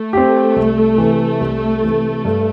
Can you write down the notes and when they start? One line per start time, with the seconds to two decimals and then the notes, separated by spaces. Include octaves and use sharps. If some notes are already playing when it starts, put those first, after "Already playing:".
Already playing: A3
0.13 C4 G4
0.56 C2
0.98 C3 E3
1.40 C2
1.83 C3 E3
2.25 G2